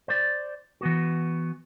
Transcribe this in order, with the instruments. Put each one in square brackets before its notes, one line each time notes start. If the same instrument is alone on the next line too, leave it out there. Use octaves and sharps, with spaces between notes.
[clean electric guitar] C5 D5
E3 B3 F#4